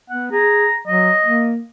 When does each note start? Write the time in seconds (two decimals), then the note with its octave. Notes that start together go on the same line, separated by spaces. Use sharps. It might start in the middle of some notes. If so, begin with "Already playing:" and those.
0.10 B3 F#5
0.32 G#4 A#5
0.87 F#3 D#5
1.25 A#3